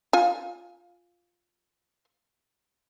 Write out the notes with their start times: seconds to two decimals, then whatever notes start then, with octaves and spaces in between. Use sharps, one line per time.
0.13 F4 G#5